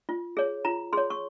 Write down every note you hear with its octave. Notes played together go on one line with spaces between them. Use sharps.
F4
G#4 C#5
F4 A#5
G#4 C#5 C6
C#6